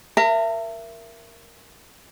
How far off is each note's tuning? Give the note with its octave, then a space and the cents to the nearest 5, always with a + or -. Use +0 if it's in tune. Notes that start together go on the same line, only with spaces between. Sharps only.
A#4 +0 E5 +25 A5 +45